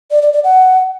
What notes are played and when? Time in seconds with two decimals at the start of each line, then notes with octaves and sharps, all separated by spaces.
0.11 D5
0.22 D5
0.33 D5
0.44 F#5